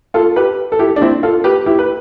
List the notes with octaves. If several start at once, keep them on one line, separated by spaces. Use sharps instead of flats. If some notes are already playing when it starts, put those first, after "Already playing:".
F4 A4
G4 B4
A4
E4 G4
D4
C4 E4
F4 A4
G4 B4
E4 G4
B4